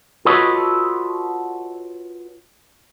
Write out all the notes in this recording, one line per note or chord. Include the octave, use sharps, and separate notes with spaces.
F4 F#4 A4 B4 C#5 D#5